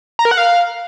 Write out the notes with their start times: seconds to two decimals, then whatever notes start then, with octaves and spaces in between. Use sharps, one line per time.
0.19 A#5
0.25 A#4
0.31 F#5
0.38 F5